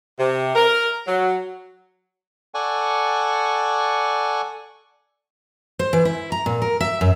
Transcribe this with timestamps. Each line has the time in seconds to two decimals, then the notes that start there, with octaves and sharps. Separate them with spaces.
0.19 C3
0.55 A#4
1.07 F#3
2.54 A4 D5 F#5 G#5 C#6
5.79 C5
5.93 E3
6.05 E4
6.32 A#5
6.46 A#2
6.62 A#4
6.81 E5
7.01 F#2